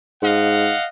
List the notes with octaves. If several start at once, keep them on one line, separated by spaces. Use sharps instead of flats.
G#2 D#5 F5 F#5